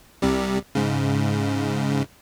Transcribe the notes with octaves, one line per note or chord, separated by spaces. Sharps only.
C2 C3 G3
G#2 C#3